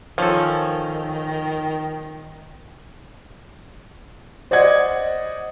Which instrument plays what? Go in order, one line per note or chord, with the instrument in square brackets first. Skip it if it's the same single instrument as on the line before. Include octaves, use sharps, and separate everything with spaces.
[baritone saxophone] D#3 [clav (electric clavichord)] F3 A4 [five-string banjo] C#4
[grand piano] C5 D5 D#5 F#5 G#6